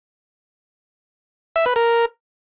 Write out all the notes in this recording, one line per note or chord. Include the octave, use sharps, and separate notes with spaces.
E5
B4
A#4